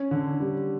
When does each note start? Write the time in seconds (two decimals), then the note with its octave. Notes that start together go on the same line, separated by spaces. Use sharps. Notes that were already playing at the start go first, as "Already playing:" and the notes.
Already playing: C#4
0.11 D3
0.40 G3